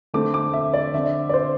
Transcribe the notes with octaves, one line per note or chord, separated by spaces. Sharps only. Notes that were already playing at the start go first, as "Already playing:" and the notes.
D3 A3 C4 D6
D6
E5
D5
D3 C4 E5
D5
C5